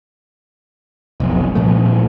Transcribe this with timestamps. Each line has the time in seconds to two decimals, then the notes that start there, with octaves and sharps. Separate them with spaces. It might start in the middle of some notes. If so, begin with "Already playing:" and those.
1.20 F1 B1
1.55 C2 A#2 F3 A3